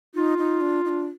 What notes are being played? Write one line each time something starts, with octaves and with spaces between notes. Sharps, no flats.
D#4 F4
D#4
D4
D#4
D4